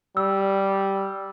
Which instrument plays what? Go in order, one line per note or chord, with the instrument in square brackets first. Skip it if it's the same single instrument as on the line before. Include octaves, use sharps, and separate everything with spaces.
[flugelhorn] G3 [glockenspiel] E6